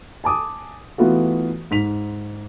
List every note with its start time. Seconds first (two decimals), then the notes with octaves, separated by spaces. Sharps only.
0.24 G#5 A5 D6 D#6
0.98 E3 A3 B3 F4 F#4
1.71 G#2 B6 F7